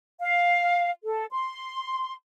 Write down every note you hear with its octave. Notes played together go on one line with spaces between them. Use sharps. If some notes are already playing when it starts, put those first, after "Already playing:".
F5
A4
C6